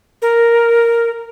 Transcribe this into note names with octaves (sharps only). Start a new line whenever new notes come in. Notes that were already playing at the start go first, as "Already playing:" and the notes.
A#4